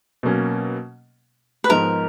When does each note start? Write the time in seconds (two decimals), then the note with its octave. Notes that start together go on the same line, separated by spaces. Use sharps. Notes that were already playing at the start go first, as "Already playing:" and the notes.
0.23 B2 F#3 A#3 C#4
1.64 B4
1.69 G#2 F3 G#3 B3 D#4 A#4